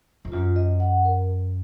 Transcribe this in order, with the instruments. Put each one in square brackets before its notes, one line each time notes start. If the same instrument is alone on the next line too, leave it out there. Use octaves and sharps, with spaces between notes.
[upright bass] F2
[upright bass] F#2 [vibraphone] F4
[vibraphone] D#5
F#5
A#4